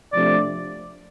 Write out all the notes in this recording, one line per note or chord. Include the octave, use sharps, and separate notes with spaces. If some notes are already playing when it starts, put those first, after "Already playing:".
C3 F3 A3 D4 D5